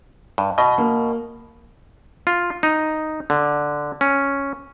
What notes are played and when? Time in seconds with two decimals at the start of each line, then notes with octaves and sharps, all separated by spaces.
0.38 G2
0.58 B2 D#5
0.78 A#3
2.27 F4
2.63 D#4
3.30 D3
4.01 C#4